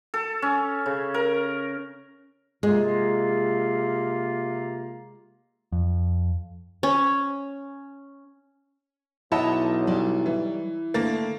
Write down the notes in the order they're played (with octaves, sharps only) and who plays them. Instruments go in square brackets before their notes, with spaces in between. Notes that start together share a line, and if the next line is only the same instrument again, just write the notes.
[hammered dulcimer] A4
C#4
C#3
A#4
[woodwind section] C3 A#3 F4 [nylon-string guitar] G#3
[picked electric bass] F2
[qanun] C#4
[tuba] B1 [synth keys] E4 [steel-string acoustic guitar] C#5 A#5 [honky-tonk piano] D#5 F#5 A5
[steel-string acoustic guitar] F#3 G3 D5
[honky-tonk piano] E3
[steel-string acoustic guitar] D3 D4 A5 [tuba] A3 [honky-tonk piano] A#3 A6